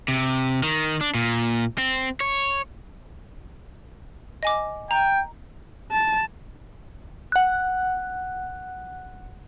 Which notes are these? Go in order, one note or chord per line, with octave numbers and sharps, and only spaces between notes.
C3
D#3
D4
A#2
C4
C#5
D#5 G#5 D6
G5 A#5
A5
F#5 F#6